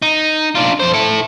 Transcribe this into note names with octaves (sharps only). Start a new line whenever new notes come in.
D#4
D4 F4
F2 C5
E4 A4